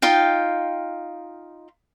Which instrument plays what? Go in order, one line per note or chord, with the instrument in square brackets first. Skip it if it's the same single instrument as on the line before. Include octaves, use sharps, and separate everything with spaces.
[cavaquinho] D#4 F4 F5 G5